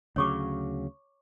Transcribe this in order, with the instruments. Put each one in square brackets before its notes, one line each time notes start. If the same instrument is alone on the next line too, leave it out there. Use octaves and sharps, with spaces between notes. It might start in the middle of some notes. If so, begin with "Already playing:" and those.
[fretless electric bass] D2 C#3 F#3 [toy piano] C#5 C#6 D6